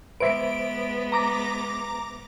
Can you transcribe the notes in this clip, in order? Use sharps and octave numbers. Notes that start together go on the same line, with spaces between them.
G#3 B3 B4 C5 E5 D7
A#5 D6 A#6